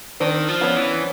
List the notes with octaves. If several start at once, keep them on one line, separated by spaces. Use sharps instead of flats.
D#3 C4 D4
F3
B3 C#4
E3